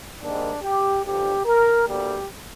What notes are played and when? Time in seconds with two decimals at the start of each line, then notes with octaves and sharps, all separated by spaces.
0.23 G#2 D#3 G3 A#3 D4
0.63 G4
1.05 G2 D3 F3 G4
1.46 A#4
1.87 D2 D3 G3 A#3 G4